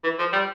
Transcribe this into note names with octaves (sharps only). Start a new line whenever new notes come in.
E3
F3
G3